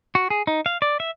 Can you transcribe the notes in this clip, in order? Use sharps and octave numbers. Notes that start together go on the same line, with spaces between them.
F#4
G#4
D#4
F5
D5
E5